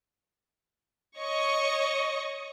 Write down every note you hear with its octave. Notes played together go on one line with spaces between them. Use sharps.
C#5 D#5 C#6